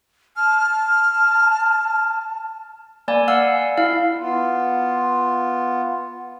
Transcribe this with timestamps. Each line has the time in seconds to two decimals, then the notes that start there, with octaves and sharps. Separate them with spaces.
0.36 A5 F6
3.08 A#3 D5 G#5
3.28 F5 F#5 E6
3.78 E4 F5
4.18 B3 F4